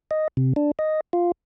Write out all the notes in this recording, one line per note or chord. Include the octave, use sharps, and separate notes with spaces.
D#5
C3
D4
D#5
F4